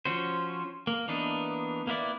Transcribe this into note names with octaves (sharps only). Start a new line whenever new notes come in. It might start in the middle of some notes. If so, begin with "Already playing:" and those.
F3 C#4 F#4 C5
A#3
E3 A#3 B3 D4 D#4
A#3 B3 E4 D5